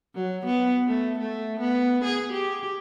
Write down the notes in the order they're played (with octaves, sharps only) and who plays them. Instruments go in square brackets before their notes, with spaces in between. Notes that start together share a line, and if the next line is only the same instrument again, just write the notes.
[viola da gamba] F#3
B3
A3
A3
B3
G#4
G4